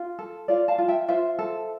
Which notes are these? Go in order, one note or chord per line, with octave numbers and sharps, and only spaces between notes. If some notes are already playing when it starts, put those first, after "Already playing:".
Already playing: F4
A4
F4 D5 F5
F5 A5
F4
E5 G5
F4 C5 E5
A4